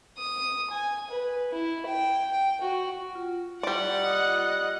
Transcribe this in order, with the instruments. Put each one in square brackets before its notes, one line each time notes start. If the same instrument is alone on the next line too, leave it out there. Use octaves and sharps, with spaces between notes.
[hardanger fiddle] D#6
G#5
B4
E4
G5
G5
F#4
[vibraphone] F4
[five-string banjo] G3 D5 [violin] F#5
[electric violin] D#5 F#6